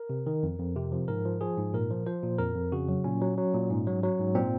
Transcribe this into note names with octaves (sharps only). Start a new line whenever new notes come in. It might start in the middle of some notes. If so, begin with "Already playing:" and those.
Already playing: A#4
C3
D#3
F2
F2
C3
F3
G#2 A#4
F3
F3 G#4
G#2
A#2 A#4
F3
F3 C5
A#2
F2 A#4
F2
C#3 F#4
F#3
A#2 C#4
F#3
F#3
A#2
G#2
F#3
F#3
G#2
A#2 C4